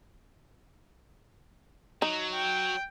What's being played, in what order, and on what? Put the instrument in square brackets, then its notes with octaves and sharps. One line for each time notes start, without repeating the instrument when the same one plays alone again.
[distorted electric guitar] F#3 [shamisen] D#4
[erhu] G5